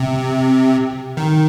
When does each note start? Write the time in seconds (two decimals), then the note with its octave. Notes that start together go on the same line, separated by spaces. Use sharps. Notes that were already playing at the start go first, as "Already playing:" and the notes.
Already playing: C3
1.17 D#3